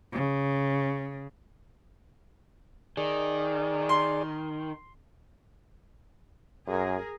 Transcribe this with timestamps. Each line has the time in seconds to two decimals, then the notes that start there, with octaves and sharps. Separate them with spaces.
0.13 C#3
2.97 D#3 G#4 D5
3.89 C6
6.67 F#2 G#4 A#4